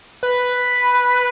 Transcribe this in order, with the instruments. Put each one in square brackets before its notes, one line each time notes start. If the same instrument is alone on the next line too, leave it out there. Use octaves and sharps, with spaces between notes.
[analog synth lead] B4